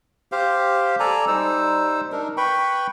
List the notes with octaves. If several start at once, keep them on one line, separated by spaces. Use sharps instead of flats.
G4 C5 F5
A4 D5 G#5 A#5
G3 D#4 C5 E6
D4 D#4 A#4
B4 G5 B5 C#6